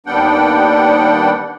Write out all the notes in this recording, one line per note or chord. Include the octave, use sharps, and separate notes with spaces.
D#2 G3 B3 D4 F#5 G5